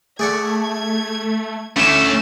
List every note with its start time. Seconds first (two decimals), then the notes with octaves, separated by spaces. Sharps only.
0.19 A3 G#4 D5 F#5 G#6
1.76 D3 A3 C#4 E4 B5 E7